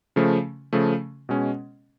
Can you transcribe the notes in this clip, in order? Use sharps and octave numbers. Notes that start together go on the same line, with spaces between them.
C#3 F3 A3
C#3 F3 A3
B2 G#3 C#4